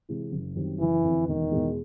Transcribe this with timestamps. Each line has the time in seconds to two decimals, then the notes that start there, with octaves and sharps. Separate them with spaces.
0.09 C3 E3 G#3
0.32 F#1
0.56 F#2 D#3 G3 C4
0.80 F#1 E3
1.04 F2 D3
1.27 E1 D#3
1.51 E2 B2 G#3